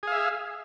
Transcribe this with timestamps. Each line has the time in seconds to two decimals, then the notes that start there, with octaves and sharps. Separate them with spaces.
0.03 G#4
0.07 F5
0.12 E5